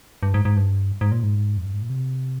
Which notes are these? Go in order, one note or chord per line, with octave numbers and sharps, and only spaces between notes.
G2
G#2
G#2
G2
G#2
A#2
G#2
F2
G2
G#2
A#2
C3